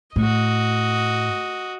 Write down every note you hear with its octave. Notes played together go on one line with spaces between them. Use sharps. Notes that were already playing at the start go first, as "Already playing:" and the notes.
A2 F#4 D#5